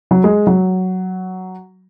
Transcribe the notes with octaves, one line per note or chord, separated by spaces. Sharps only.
F#3
G#3
F#3